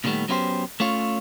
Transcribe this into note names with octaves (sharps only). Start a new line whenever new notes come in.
A#2 D3 D#3 G3 A3 B3
F#3 B3 C#4 E4 G4 C5
A3 C#4 F4 C#5